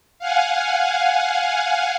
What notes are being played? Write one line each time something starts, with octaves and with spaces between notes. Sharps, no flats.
F5 F#5 G#5